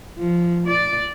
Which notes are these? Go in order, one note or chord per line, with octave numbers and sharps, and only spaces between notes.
F3
D5